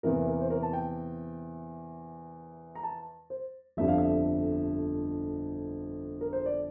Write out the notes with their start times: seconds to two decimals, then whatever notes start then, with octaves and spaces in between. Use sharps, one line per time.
0.03 E2 C3 E3 A#3 A#4
0.26 A#4
0.41 C5
0.50 A#4
0.63 A5
0.73 G5
2.75 A#5
2.83 A5
3.30 C5
3.77 G1 F2 D3 G3 E5
3.88 F5
3.98 E5
6.21 A#4
6.33 C5
6.46 D5